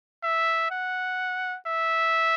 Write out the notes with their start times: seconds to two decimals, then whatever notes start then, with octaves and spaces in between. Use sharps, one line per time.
0.24 E5
0.71 F#5
1.68 E5